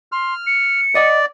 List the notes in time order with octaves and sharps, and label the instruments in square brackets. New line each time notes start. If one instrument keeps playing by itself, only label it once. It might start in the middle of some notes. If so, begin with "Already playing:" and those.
[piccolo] C6 [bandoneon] F6
[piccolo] C#7
[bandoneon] D5 [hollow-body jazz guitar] D#5 F#5